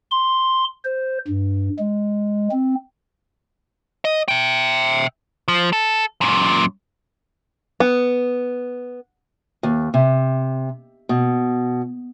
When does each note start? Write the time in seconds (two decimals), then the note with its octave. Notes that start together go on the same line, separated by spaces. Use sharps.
0.11 C6
0.85 C5
1.28 G2
1.79 G#3
2.51 C4
4.05 D#5
4.28 E5 G5
5.48 F3
5.73 A4
6.21 F#2 A#2
7.80 B3
9.63 D#2
9.94 C3
11.09 B2